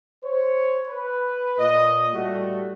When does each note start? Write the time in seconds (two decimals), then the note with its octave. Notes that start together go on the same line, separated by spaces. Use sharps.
0.24 C5 C#5
0.87 B4
1.58 A#2 D#5
2.13 A2 G3 A3 F#4